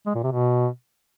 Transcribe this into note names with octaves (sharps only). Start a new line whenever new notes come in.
G#3
A#2
C3
B2